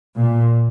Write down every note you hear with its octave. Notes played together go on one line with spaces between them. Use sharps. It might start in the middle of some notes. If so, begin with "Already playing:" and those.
A#2